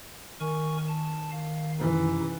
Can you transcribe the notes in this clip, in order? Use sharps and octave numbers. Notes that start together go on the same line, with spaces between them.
D#3 A#4 G#5 C#6
A5
F5
F#2 C3 E3 D#4